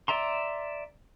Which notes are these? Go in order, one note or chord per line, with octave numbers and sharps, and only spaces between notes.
D5 E5 A#5 C6